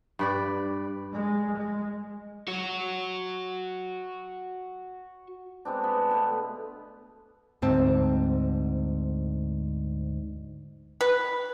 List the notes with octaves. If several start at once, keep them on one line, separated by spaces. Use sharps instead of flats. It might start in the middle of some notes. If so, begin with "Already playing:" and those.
G2 B4 D5
G#3
G#3
F#4 C#5
G#3 B3 C4 D4
B3
B2 G#3 A3
D2 G#2 C4 A5
B4